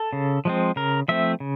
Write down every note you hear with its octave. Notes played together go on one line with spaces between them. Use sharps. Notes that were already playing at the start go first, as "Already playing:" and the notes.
Already playing: A4
C#3
F3 G#3 C4
C#3 A#4
F3 A3 C4 E5
C#3